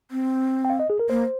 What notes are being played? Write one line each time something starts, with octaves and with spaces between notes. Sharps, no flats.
C4
G5
F5
D#5
G#4
A#4
A#3 C5